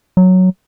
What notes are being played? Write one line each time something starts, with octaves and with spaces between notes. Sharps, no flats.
F#3